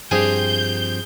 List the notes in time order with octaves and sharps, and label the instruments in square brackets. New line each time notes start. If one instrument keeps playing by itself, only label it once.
[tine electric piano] G2 C5 C7 [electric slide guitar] F3 C4 G4 [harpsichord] G#4 [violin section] G6